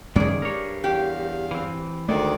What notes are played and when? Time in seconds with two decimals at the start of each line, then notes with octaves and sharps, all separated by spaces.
0.16 C#2 F#2 D#3 G#3 A#3 C#4 G#4 D5
0.42 G2 A#4 C#5
0.84 E2 G4 F5
1.51 E3 C4
2.09 D2 D#3 G#3 A3 D5